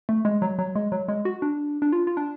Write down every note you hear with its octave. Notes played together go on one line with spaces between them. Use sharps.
A3
G#3
F#3
F#3
G#3
F#3
G#3
F#4
D4
D4
F4
F4
D4